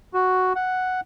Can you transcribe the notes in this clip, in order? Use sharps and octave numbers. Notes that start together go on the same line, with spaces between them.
F#4
F#5